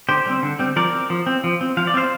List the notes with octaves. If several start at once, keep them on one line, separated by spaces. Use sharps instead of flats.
D3 G4 C5
G3 C4
D3
G3 C4
F3 A#4 D5
C4
F3
C4
F3
C4
F3 F5
D5
C4 C5 F5